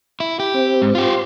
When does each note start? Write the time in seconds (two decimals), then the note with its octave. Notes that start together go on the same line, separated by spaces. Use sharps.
0.20 E4
0.40 G4
0.54 C4
0.82 G#2
0.95 F4 G4 C5 C6